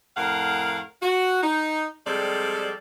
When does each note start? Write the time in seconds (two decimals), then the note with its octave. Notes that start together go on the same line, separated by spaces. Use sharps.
0.17 F2 A2 A#4 F5 F#5
1.02 F#4
1.43 D#4
2.07 C3 F3 G3 G#3 A4 D5